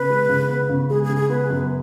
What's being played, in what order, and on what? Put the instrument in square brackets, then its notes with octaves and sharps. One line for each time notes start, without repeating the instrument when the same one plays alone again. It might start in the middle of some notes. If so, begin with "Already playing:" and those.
Already playing: [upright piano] C#3 B3 [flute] B4
[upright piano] G#3
C#3
B3
C#3
[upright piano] G#3 [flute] G#4
[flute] G#4
[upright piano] C#3
[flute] G#4
[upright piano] B3 [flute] B4
[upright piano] F#2